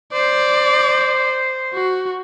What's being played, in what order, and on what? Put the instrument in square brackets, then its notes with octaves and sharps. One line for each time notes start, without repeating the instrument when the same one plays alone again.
[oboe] C5 [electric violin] D5
[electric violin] F#4